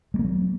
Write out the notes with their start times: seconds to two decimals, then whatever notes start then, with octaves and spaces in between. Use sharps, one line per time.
0.14 G#3
0.19 A#3
0.24 F#3